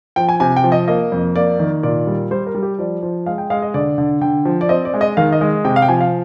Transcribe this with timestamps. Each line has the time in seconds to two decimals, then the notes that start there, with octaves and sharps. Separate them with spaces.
0.16 F3 G5
0.29 G#5
0.40 C3 G#5
0.56 G5
0.64 F3
0.72 D#5
0.88 A#3 D#5
1.12 F2
1.35 A#3 D5
1.59 D#3
1.83 A#2 D5
2.07 G3
2.31 G3 C5
2.47 A#4
2.55 G3
2.62 G4
2.78 F3 D5
3.03 F3
3.26 G#3 F5
3.38 G5
3.50 G#3 F5
3.62 D#5
3.74 D3 D5
3.98 D3
4.21 D3 G5
4.45 F3
4.61 D5
4.69 C4 D#5
4.85 D5
4.94 G#3
5.01 D#5
5.17 D#3 F5
5.32 D#5
5.41 G#3
5.65 C3 G5
5.76 F5
5.82 G5
5.88 F3 G#5
6.01 F5